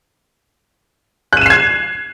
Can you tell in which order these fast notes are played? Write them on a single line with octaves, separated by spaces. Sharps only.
F#6 D#7 E7 C7 G#6